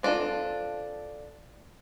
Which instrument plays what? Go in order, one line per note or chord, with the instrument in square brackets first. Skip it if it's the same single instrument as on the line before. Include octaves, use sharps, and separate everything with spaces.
[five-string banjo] C4 D4 F4 A4